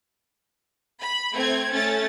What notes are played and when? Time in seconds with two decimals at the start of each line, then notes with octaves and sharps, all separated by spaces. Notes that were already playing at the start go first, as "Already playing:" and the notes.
1.01 B5
1.34 A3 C4 G#6
1.73 A3 C#4 A6